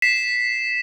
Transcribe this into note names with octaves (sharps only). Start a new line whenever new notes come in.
B6 C7 E7